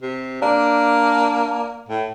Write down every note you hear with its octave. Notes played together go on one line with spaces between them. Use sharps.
C3
A#3 D4
A2